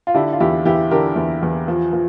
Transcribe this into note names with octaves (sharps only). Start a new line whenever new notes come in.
F4
D3 E4 G4
F4
E2 E4 G4
E2 E4 G4
D3 G4 A#4
E2
E2
F3
F3